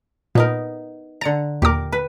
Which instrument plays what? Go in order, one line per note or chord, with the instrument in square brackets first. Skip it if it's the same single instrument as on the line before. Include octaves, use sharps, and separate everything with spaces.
[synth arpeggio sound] A#2 [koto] B3 D#4 A#4
[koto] D3 A#5 [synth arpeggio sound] A6 C#7
[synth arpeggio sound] D#2 A#2 D6 [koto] G4 A#4
[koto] B4